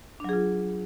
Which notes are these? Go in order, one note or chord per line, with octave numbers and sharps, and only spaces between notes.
F#3 D4 F4 G#4